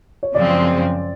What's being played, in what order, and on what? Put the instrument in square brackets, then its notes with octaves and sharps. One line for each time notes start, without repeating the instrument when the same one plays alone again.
[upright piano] C#5
[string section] F#2 C#3 F3 G#3 C4 [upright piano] D5